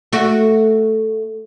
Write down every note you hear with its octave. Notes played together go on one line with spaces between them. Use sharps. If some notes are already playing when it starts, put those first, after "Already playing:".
A3 F#4